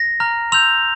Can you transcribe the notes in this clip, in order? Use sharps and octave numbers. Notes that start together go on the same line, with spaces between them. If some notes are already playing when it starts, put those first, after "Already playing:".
Already playing: A#6
A#5 F6
C6 E6 G6 F7